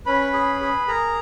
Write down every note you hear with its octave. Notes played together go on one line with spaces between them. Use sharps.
C#4 B4 B5
G#4
G#4
G#4 A#4 A#5